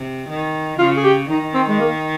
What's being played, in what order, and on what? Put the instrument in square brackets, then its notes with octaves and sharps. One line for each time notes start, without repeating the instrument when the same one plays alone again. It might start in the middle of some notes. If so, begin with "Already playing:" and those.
Already playing: [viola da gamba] C3
D#3
[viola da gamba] C#3 [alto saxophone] F4
[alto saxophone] G#4
G4
[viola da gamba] D#3 [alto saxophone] D#4
[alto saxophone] C4
G#3
A#3